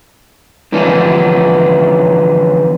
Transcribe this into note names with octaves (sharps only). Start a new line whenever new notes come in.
D3 E3 F3 B3 C#4 D4